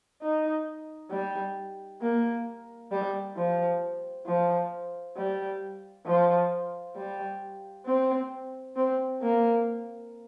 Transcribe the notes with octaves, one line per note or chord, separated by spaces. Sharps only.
D#4
G3
A#3
G3
F3
F3
G3
F3
G3
C4
C4
A#3